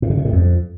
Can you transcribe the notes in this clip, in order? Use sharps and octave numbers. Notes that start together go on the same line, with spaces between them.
A2
C#3
C3
A2
F2